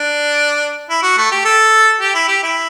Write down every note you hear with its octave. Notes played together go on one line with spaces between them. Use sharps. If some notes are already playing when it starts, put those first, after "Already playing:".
Already playing: D4
E4
F#4
A3
G4
A4
G4
E4
G4
E4